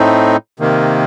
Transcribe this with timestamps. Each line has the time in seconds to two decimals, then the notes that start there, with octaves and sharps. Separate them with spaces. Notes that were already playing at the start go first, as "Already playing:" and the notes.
Already playing: A2 A3 C4 D#4
0.60 C3 D#3 A#3